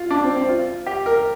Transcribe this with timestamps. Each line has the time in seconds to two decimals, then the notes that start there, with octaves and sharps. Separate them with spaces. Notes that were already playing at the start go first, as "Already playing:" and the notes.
Already playing: F4
0.11 D4
0.23 C4
0.36 C4
0.49 F4
0.86 G4
1.06 A#4